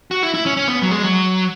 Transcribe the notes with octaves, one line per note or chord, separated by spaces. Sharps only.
F#4
E4
E4
C#4
C#4
B3
F#3
G#3
F#3